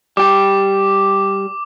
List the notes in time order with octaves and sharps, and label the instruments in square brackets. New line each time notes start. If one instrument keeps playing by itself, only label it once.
[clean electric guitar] G3 G4 [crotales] D6